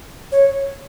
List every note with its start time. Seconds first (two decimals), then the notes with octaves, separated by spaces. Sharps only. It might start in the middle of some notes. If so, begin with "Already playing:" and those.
0.32 C#5